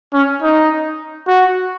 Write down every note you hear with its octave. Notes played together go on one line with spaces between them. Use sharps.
C#4
D#4
F#4